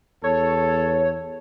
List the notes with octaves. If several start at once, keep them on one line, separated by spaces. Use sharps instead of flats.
E2 A4 C#5